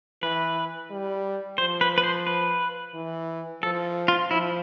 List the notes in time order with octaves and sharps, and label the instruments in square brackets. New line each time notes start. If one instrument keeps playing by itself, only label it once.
[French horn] E3 [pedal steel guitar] B4
[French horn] G3
[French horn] F3 [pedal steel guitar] C5
[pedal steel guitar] B4
B4
C5
B4
[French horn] E3
[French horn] F3 [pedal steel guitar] A4
[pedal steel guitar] F4
[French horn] F3 [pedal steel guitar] E4